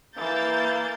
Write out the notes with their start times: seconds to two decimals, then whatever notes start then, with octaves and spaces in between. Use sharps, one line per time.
0.17 E3 A#3 G6 A6